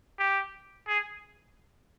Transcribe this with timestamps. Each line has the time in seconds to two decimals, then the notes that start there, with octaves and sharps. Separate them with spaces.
0.19 G4
0.88 G#4